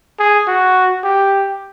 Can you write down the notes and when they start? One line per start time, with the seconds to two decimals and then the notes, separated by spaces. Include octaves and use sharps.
0.19 G#4
0.48 F#4
1.04 G4